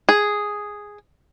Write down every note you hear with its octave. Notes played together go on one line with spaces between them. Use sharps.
G#4